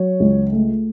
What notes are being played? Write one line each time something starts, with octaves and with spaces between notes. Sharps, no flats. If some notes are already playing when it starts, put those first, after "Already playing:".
Already playing: F#3 C#5
C#2
A3